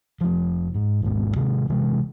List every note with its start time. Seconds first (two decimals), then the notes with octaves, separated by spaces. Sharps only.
0.21 F1 F3
0.75 G#2
1.02 G#1 D#2 G#2 B2
1.36 C3 D#3 G#3
1.69 C3 D#3 E3 G#3